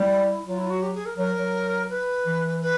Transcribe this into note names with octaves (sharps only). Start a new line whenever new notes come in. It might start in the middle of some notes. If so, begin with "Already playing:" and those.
Already playing: G3 E4
F#3 F4
E4
F4
F#4
G4
G#4
A#4
F#3 A#4
F#3
B4
E3
B4